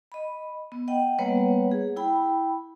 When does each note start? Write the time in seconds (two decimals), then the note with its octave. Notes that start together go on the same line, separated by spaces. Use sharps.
0.12 D#5 B5
0.72 B3
0.88 D#5 F#5 G5
1.18 G3 A#3 B3 B4 C#5 F#5
1.71 G#4
1.96 E4 G5 B5